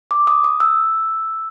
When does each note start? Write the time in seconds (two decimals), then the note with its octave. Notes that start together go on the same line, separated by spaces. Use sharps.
0.11 D6
0.27 D#6
0.44 D#6
0.60 E6